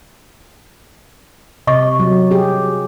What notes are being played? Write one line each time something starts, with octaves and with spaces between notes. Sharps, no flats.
C3 D#5 C#6 D6
F#3
G4 G#4